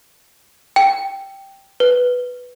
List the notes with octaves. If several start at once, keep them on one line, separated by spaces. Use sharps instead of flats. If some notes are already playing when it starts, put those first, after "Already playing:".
G5
B4